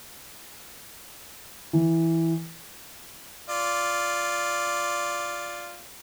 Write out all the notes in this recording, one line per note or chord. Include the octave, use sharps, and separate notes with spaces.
E3
F4 D5